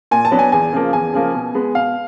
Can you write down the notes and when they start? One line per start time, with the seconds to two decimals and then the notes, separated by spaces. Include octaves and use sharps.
0.11 A#2 G#5
0.25 A5
0.31 F#3 B3 D4
0.39 G#5
0.52 E2 G#5
0.73 C#3 F3 A#3
0.93 E2 G#5
1.14 C#3 F3 A#3
1.34 B2
1.55 G#3 B3
1.75 B2 F5